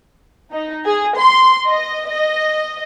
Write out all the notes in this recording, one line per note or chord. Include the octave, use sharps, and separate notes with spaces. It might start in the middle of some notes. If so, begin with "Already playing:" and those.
D#4
G#4
C6
D#5
D#5